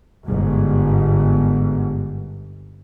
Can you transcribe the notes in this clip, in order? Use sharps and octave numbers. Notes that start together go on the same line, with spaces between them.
G1 G#2